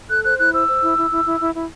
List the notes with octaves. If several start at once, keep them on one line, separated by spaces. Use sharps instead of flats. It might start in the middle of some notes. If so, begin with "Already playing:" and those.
A4 F#6
C5 F#6
E4 F#6
C5 E6
C5
E4
E4
E4
E4
E4
E4